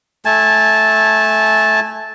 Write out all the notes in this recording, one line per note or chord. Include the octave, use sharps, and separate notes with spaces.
A3 G#5 A5